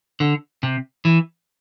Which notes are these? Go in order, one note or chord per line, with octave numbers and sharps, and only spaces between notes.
D3
C3
E3